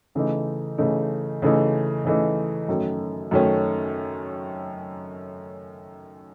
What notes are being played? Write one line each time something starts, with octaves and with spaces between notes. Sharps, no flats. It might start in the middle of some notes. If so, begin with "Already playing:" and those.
C#3 E3 A3 D#4
C#3 E3 A3 D#4
C#3 E3 A3 D#4
C#3 E3 A3 D#4
F#2 D#3 A3 C#4
F#2 D#3 A3 C#4